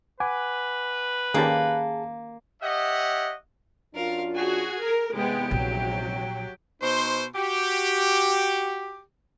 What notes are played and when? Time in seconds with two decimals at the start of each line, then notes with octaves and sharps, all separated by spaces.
0.20 B4 F#5 G#5 D6
1.34 D#3 A#3 C#4 G4 G#4 A5
2.62 G4 C#5 D#5 E5 F#5
3.95 F#2 D4 F4 A#4 F5
4.35 F#4 G#4 G#5
4.82 A#4
5.14 E2 G#2 C3 G#3 B3 G4 G5
5.51 A#1 F#3
6.82 B2 D#4 C5
7.35 F#4 G4